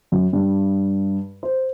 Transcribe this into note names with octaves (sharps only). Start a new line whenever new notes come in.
F#2
G2
C5